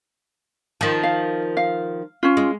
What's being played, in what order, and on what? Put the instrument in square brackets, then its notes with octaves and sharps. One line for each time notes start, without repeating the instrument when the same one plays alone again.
[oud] D#3 F3
[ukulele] F5
F5
C#4 F4
[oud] G#3